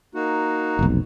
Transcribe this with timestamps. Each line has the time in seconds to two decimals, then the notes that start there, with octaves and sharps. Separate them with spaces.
0.15 A#3 D#4 F#4
0.79 F1 B1